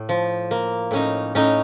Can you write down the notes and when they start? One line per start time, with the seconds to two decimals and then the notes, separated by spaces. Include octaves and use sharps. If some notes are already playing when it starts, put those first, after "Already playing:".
Already playing: A2
0.09 F3
0.51 A#3
0.91 A2 C#4 D#4
1.35 A2 C#4 D#4